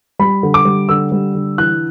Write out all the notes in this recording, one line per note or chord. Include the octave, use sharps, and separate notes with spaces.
G3 B5
D3
D6
G3
D3 E6
G3
D3
E3 F#6